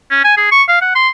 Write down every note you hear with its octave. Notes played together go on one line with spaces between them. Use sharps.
C#4
G#5
G#4
C#6
F5
F#5
C6